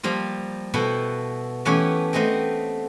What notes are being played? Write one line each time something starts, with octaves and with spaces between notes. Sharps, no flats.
F3 G3 A#3 F4
B2 B3 E4 A4 G5
E3 A3 B3 C#4 G4 C#5
A3 B3 C4 D#5 G5